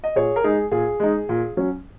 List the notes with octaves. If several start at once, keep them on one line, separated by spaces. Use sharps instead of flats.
D#5
A#2 G#4 C#5
A#4
G#3 D#4 G#4
A#2 G#4
G#3 D#4
A#2
F#3 C#4